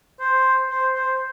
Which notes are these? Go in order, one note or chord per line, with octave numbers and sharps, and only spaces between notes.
C5
C5
C5